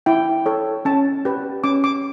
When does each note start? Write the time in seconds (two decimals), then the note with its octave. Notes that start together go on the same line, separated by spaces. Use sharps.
0.06 E4 G5
0.46 A4 C#5
0.85 C#4 A5
1.25 G4 B4
1.64 C#4 D6
1.84 D6